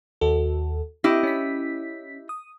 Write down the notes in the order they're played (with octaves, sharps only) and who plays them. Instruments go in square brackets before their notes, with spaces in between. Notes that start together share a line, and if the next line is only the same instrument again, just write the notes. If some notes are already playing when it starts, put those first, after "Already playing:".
[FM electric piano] D#2 F#4 A4
[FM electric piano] C4 [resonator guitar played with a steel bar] E4 G4 D#5
[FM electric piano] C#4 B6
D#6